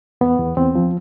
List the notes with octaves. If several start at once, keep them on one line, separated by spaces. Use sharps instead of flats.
E2 B3
E2
E2 C4
F3